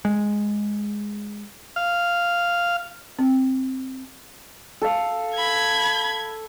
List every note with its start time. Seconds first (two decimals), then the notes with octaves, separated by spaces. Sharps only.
0.05 G#3
1.76 F5
3.19 C4
4.82 A4 F5
5.35 B5 G#6